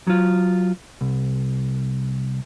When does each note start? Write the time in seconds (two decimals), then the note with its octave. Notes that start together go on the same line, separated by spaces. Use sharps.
0.07 F#3 F4
1.01 C2